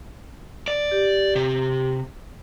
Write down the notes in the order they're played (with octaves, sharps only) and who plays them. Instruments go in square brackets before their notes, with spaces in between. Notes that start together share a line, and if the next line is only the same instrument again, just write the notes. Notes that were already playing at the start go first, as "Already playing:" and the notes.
[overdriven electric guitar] D5
[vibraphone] G4
[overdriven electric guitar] C3